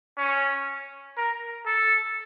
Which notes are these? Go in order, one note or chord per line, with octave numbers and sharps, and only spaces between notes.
C#4
A#4
A4